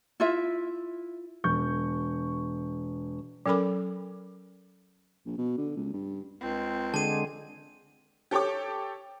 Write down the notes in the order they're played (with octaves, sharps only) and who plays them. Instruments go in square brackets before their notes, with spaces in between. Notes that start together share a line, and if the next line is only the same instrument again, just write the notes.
[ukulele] E4 F4 E5
[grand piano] E1 C#6 G6
[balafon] F#3 C#4 A4 A#4 B5 D6
[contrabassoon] A#1
B2
D3
C#2
G2
[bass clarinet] C#2 [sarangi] C4
[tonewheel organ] D3 G#3 [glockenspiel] A5 D#7
[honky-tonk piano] G4 A4 C#5 G5 D6